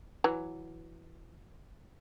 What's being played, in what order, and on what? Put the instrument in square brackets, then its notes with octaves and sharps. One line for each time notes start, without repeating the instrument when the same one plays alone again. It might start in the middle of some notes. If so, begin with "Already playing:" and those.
[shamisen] E3 F#3